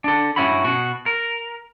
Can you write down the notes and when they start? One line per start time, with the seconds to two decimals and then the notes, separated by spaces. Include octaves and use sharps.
0.04 D4 A4
0.36 G2 C3 C#4 E4 F#4 B5
0.64 B2 F#4
1.06 A#4